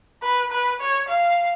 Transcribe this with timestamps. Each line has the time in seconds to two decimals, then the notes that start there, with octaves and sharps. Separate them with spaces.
0.22 B4
0.51 B4
0.80 C#5
1.08 F5